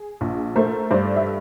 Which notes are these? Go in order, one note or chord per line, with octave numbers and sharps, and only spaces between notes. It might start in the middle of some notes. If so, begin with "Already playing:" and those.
Already playing: G#4
A#1
A3 A#4 C5
G2 C5 D5
E5